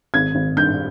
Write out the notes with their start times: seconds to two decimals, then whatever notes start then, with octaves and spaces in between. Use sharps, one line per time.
0.14 G#1 G#6
0.35 G#1
0.57 G2 G6